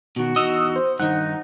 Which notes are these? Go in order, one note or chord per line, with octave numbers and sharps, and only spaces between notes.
B2 D#3 F#4
E2 D#4 D#5 D#6 E6
C5
G2 D#3 D#4 F#5